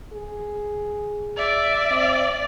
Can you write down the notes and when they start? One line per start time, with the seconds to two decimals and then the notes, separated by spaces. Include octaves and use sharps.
0.13 G#4
1.37 D5 E5
1.91 C4